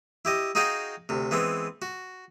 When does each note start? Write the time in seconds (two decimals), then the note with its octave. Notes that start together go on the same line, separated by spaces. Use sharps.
0.25 E4 G4 D#5
0.55 D#4 F#4 G#4 D#5 F5 G5
1.09 D2 C3
1.31 E3 G#3 B3 C4
1.82 F#4